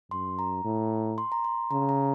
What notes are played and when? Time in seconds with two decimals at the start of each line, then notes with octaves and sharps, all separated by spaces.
0.11 F#2 C6
0.39 A#5
0.64 A2
1.18 C6
1.32 A#5
1.44 C6
1.71 C#3 A#5
1.89 A#5